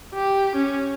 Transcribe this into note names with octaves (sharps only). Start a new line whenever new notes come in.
G4
C#4